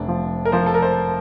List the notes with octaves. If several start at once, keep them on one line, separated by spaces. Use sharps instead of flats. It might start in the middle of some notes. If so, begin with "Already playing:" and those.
Already playing: F1 D4
F3
A#4
F3 C5
A4
A#4
C5